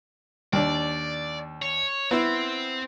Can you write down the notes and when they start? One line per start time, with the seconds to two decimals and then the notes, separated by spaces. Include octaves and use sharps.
0.53 D#2 D4 D5
1.62 C#5
2.11 B3 C4 E4